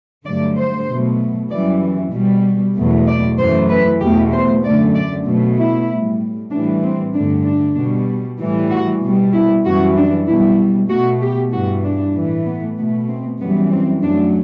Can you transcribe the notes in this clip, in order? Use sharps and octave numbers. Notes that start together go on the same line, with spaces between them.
G2 D3 F#3 A3 D5
C5
B2 F#3 A3
F#2 E3 G3 D5
B2 G3
E2 B2 F#3 A3
D5
F#2 E3 A3 C5
B4
E2 B2 A3 G4
C5
F#2 D3 A3 D5
D5
B2 F#3 A3
E4
A2 G3
A2 E3 G3 D4
C4
G2 D3 A3 D4
D4
B2 G3
A2 E3 G3
F#4
B2 G3
E4
F#2 E3 G3 F#4
D4
B2 G3 E4
B2 A3 F#4
G4
G2 E3 G3 F#4
D4
A2 E3 A3
B3
B2 A3 B3
C4
F#2 E3 G3 B3
C4
F#2 F#3 A3 D4